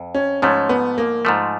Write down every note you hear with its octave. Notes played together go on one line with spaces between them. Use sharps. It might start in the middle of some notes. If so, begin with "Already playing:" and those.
Already playing: F2
C#4
G#2 F3 A3 C#4
B3
A#3
G#2 F3 A3